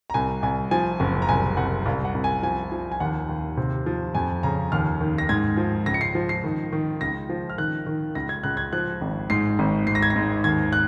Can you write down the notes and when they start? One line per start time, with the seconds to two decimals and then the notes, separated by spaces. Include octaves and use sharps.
0.10 A#5
0.14 C2 G#5
0.43 C2 G#5
0.71 F3 G#5
1.00 F#1
1.22 A#5
1.29 C2 G#5
1.57 C2 F#5
1.86 C2 F5
2.05 F#5
2.14 C2
2.24 G#5
2.43 F3 G#5
2.72 F3
2.92 G#5
3.00 D#2 F#5
3.29 D#2
3.57 C3
3.86 F3
4.15 F2 G#5
4.43 C#3 A#5
4.72 D#2 F6
5.01 D#3
5.18 A#6
5.29 G#2 G#6
5.57 F3
5.86 C#2 A#6
5.94 C#7
6.01 C7
6.15 F3
6.29 C7
6.44 D#3
6.72 D#3
7.01 C#2 A#6
7.30 F3
7.50 F6
7.58 D#3 F#6
7.86 D#3
8.15 C#2 A#6
8.29 G#6
8.44 C#2 F#6
8.57 G#6
8.73 F3 F#6
9.01 G#1
9.30 G#2 C7
9.59 G#1
9.87 G#2 C7
9.95 A#6
10.02 G#6
10.10 A#6
10.16 G#2
10.44 D#2 G#6
10.73 F#6